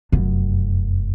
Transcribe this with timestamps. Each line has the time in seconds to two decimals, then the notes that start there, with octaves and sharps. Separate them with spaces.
0.12 F1 F#2